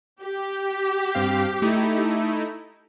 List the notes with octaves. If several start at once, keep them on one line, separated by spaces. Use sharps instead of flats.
G4
G2 C4 F5
A3 D#4 E4